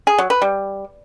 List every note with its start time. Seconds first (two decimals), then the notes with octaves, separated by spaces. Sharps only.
0.07 G#4
0.18 F#3
0.30 B4
0.42 G3